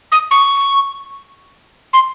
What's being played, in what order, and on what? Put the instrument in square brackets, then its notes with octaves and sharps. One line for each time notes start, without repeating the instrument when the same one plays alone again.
[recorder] D#6
C#6
C6